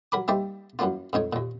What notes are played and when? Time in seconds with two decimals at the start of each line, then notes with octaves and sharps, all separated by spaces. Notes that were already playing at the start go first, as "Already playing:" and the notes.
0.12 F#3 A#4 B5 D6
0.28 G3 A#3 D#4 C5 D5 E5
0.79 F#2 E3 F#3 A#3 F4
1.13 F2 G#2 D#4 C#5
1.33 D#2 A#2